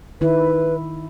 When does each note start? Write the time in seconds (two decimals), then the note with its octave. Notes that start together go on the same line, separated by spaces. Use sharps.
0.21 D#3 E4 B4